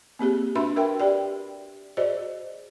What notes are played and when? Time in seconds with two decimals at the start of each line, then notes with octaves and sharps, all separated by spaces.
0.19 A#3 C4 G4 G#4
0.55 D4 F#4 B4 E5 B5 C6
0.76 F#4 A#4 B4 E5 G5
1.00 G4 D5 G5
1.97 F#4 G#4 C5 D5 D#5